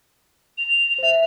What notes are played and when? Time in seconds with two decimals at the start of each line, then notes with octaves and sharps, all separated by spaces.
0.58 F7
0.98 C5 E5